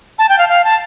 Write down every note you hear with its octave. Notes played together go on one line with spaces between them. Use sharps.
A5
G5
F5
F5
A5